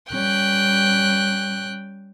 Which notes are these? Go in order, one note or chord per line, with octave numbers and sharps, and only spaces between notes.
G3 C#4 G5 F#6